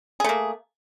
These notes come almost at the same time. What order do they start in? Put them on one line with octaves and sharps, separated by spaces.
G#4 A3 A#3